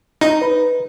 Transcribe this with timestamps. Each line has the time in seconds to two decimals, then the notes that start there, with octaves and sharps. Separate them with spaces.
0.21 D#4
0.41 B4